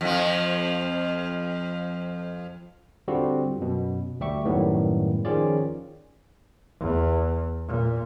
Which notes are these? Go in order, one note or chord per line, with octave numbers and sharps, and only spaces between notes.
F2 F3
D3 G3 C4 F4 F#4
F#2 B2
D2 G3 G4 E5 C#6
F#2 A2 D#3 G3 A#3 B3
D#3 F3 C#4 F4 G#4 D5
E2
A#2